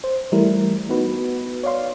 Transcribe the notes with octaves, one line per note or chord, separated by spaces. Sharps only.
C5
E3 G3 A3 E4 A#4
B3 D#4 F#4 B4
C#5 D5 F5 C6